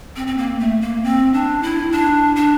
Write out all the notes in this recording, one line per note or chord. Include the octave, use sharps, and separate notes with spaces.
C4
C4
A#3
A3
A#3
C4
D4
E4
D4
D4